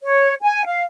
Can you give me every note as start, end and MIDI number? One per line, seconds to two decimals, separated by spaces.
0.03 0.34 73
0.41 0.64 80
0.65 0.84 77